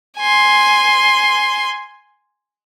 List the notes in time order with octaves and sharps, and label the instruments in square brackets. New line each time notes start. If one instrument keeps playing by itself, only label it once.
[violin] G#5 C6